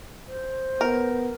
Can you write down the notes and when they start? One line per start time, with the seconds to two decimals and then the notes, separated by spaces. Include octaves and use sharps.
0.27 C5
0.81 B3 A#4